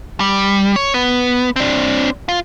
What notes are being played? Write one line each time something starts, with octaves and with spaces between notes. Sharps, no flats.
G3
C#5
B3
C4 D4
F4